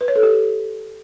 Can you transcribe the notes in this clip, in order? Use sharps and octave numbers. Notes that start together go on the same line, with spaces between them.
B4
C#5
A4
G4